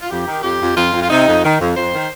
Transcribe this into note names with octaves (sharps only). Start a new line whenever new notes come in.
F4
F2 G4
D#3
F2 G4
F2
F2 F4
F2
F4
C3 D#4
F2
D#3
F2
F2 C5
D#3